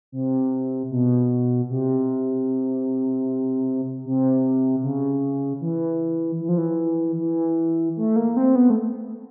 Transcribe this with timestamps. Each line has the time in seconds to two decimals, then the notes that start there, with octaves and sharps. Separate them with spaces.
0.12 C3
0.91 B2
1.70 C3
4.05 C3
4.83 C#3
5.61 E3
6.40 E3
6.49 F3
6.58 E3
7.18 E3
7.97 A3
8.16 A#3
8.37 C4
8.55 B3
8.70 A3